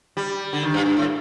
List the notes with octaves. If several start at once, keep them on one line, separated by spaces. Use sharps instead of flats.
G3
D3
D#3
G2
G2
A2